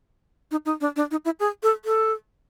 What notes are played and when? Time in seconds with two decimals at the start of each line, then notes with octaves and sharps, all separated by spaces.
0.51 D#4
0.66 D#4
0.81 D4
0.96 D4
1.11 D#4
1.25 E4
1.40 G#4
1.63 A4
1.85 A4